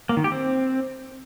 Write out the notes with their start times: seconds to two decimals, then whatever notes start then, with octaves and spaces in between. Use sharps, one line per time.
0.09 A#3
0.17 D#3
0.24 G4
0.32 C4